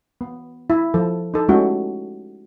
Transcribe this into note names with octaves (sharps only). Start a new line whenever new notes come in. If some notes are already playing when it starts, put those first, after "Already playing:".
B3
E4
F3 A4
D#4 A4
G#3 A3 C#4 E4 F#4 G4